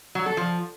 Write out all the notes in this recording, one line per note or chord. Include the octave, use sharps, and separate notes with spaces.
F#3
A4
F3